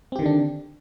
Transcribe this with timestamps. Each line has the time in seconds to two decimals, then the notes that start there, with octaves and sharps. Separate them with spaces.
0.12 C4
0.16 G4
0.19 D#3
0.22 D3
0.26 D4